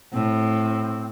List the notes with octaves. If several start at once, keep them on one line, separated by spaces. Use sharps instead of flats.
A2 C4